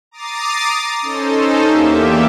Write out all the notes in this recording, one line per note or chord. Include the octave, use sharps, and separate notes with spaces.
A#5 D6 D#6 A6 C7
C#4 D#4 A4 C5
E2 A#3 G4 E5